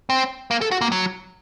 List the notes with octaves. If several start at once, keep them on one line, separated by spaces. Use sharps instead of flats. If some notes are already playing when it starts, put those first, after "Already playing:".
C4
A#3
A4
F#4
A#3
F#3